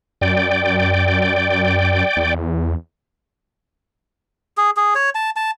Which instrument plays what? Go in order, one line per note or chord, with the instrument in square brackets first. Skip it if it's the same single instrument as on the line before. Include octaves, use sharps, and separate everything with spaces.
[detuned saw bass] F#2 [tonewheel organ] D5 G5
[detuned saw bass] E2
[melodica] G#4
G#4
C#5
A5
A5